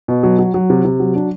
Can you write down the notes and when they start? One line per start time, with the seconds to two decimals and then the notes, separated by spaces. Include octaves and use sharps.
0.08 B2
0.23 F#3
0.39 F#3
0.54 F#3
0.70 C3
0.85 C3
1.00 F#3
1.15 D4